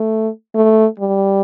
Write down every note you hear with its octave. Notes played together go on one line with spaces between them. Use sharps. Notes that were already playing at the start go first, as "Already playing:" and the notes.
Already playing: A3
A3
G3